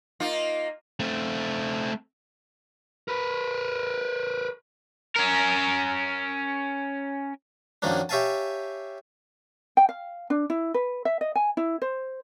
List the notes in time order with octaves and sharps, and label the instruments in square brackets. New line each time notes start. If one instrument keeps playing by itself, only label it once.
[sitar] A#3 D#4 F4
[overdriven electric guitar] A3 C4
[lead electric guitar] A#4 B4
[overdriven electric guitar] C#4 A#4
[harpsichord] F#2 D#3 F3 A#3 C#4 D4
G4 C#5 E5 F5 G#5 A5
[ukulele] G5
F5
D4
E4
B4
E5
D#5
G#5
E4
C5